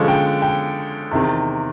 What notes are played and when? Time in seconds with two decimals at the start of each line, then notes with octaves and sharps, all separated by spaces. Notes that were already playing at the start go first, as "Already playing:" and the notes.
Already playing: D3 F3 G#3 C#4
0.08 G5
0.42 G5
1.11 E2 C3 D#3